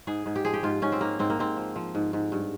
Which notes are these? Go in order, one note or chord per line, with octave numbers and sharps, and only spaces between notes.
G#2 G#4
G#2
G4
F3 G#4
G4
G#2 F4
G#2 C#4
C4
G#2 A#3
G#2 C4
A#3
G#2 C4
F3
F3
G#2
G#2
G2